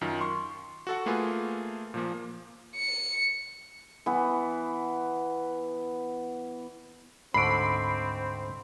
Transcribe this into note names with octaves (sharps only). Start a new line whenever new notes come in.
F#2 D#3 F4
C6 C#6
F#4 A4 F#5
A3 A#3 F4 G#4 B4 G#5
A#2 F3 A#3
C#7
E3 B3
D2 G#2 D3 C4 B5 C#6 C7 D7